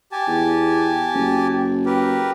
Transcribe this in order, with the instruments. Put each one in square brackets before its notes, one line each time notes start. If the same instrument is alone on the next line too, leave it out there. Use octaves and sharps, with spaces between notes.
[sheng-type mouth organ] G4 G#5 A5
[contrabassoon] E2
F#1
[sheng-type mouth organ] G4 A#4 B4